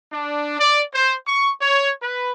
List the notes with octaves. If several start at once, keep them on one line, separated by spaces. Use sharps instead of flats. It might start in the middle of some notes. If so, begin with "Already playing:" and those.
D4
D5
C5
C#6
C#5
B4